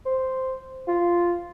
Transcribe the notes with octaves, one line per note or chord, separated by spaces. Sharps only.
C5
F4